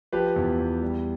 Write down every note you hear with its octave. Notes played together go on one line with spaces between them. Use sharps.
F3 G4 B4
E2
E2
G3